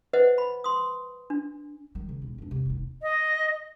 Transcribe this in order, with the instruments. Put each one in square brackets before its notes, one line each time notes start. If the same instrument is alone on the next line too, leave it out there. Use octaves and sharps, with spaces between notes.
[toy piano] B4 C5 D#5 E5 F#5
B5
C6 D#6
D4
[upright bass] D#3 F#3
C#3
E1 D#2
E1 D4
C3
E1 D#2
[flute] D#5